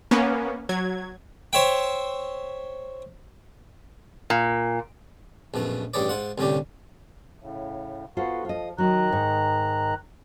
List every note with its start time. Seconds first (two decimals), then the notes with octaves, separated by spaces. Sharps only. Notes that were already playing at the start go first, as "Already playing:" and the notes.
0.11 A#3 B3 C#4
0.69 F#3 G#6
1.53 C5 C#5 E5 G5
4.30 A#2
5.54 A#1 F#2 B2 A3
5.94 A1 G2 G3 G#4 C#5 D5
6.09 G#2 F4 F#5
6.38 C2 A2 D3 C#4 G4
7.40 A2 C#3
8.17 B3 F4 F#4 A4 C5
8.45 F3 F4 D#5
8.78 D#3 F#3 D#4 A#5 F#6
9.09 D#2 G#2